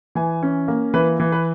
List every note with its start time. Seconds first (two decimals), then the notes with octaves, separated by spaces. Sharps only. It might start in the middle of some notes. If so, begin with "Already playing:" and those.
0.15 E3 G#5
0.43 C#4
0.68 A#3
0.94 E3 B4
1.20 E3
1.32 B4